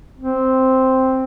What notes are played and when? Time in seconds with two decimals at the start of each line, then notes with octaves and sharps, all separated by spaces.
0.18 C4